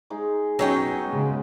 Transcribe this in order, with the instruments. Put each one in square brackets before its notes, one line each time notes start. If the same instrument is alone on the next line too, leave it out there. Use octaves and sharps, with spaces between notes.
[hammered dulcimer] G#3 D#4 G#4
[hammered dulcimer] B2 F#4 [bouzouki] F#3 D#4 G5 [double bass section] C#4
[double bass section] C#3 G#3